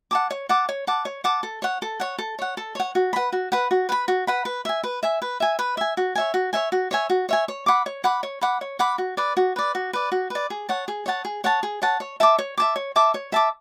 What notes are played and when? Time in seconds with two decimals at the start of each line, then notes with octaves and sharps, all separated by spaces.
0.11 F#5 A5 D6
0.31 C#5
0.49 F#5 A5 D6
0.69 C#5
0.87 F#5 A5 D6
1.05 C#5
1.24 F#5 A5 D6
1.43 A4
1.62 C#5 F#5
1.82 A4
2.00 C#5 F#5
2.19 A4
2.39 C#5 F#5
2.57 A4
2.75 C#5 F#5
2.95 F#4
3.13 B4 F#5 B5
3.32 F#4
3.52 B4 F#5 B5
3.71 F#4
3.89 B4 F#5 B5
4.08 F#4
4.27 B4 F#5 B5
4.45 B4
4.65 E5 G#5
4.84 B4
5.03 E5 G#5
5.22 B4
5.40 E5 G#5
5.59 B4
5.77 E5 G#5
5.97 F#4
6.15 C#5 E5 G#5
6.34 F#4
6.53 C#5 E5 G#5
6.72 F#4
6.91 C#5 E5 G#5
7.10 F#4
7.29 C#5 E5 G#5
7.48 C#5
7.66 F#5 B5 D6
7.86 C#5
8.04 F#5 B5 D6
8.23 C#5
8.41 F#5 B5 D6
8.61 C#5
8.79 F#5 B5 D6
8.98 F#4
9.17 B4 D5
9.37 F#4
9.56 B4 D5
9.75 F#4
9.93 B4 D5
10.12 F#4
10.30 B4 D5
10.50 G#4
10.69 C#5 F#5 A5
10.88 G#4
11.06 C#5 F#5 A5
11.25 G#4
11.44 C#5 F#5 A5
11.63 G#4
11.82 C#5 F#5 A5
12.00 C#5
12.20 E5 A5 D6
12.39 C#5
12.58 E5 A5 D6
12.76 C#5
12.96 E5 A5 D6
13.14 C#5
13.32 E5 A5 D6